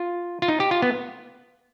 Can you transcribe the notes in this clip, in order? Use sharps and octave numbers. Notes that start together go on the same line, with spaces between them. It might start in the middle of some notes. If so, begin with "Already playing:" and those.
Already playing: F4
F4
D#4
G4
F4
B3